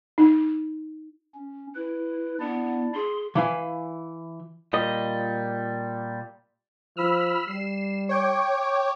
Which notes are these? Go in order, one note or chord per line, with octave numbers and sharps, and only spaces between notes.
D#4
C#4
E4 B4
B3 D4 E4 D5
G#4 C6
E3 E4 F5 G#5
A#2 G3 D#5
F3 B5 E6 F6
G3 C7 E7
C#5 G5 D6